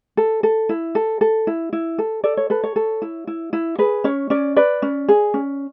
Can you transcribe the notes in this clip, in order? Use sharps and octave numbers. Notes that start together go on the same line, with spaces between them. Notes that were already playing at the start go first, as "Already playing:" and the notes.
A4
A4
E4
A4
A4
E4
E4
A4
A4 D5
C#5
A4 B4
C#5
A4
E4
E4
E4
G#4 B4
C#4 C#5
C#4 D5
B4 D5
C#4
G#4
C#4